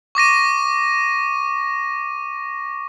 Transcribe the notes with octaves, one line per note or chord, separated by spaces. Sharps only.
C#6 D6 A#6 D#7